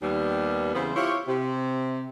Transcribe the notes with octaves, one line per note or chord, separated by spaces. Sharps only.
D#2 G3 B3
E2 C#3 E3 B3 C4 C5
E4 F4 G4 C5 C#5
C3